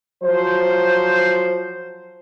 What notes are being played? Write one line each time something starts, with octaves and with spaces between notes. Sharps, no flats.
F3 F#3 C5